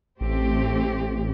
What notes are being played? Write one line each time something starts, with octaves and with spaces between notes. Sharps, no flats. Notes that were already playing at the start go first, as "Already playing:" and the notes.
A1 A3 C4 G4